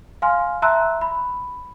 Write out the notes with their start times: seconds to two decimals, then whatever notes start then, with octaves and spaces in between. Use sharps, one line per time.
0.22 F5 G#5 C6 F6
0.62 E5 A5 A#5 C6 E6 F#6
1.01 B5